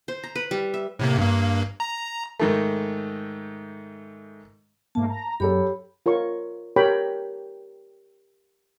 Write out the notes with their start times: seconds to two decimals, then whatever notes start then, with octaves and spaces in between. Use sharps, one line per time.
0.08 C5
0.24 A#5
0.36 B4
0.51 G3
0.74 E5
0.99 A2 C3 A#3
1.18 G2 A#3
1.80 A#5
2.40 G#2 D#3 A3
4.95 G#2 A3 A#3 A5
5.09 A#5
5.40 F#2 G4 A4 C#5 B5
6.06 F4 A#4 C#5 C#6
6.76 G4 A#4 C#5 G5 B5